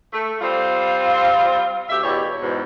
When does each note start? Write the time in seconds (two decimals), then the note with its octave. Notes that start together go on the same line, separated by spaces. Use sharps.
0.13 A3
0.41 G3 C4 F4
1.89 D2 G4 E5
2.03 E2 B2 G4 C#5
2.41 E2 G#2 B2